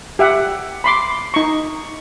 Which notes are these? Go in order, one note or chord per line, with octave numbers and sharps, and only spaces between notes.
G4 E5 F#5
B5 C6 D6
D#4 C#6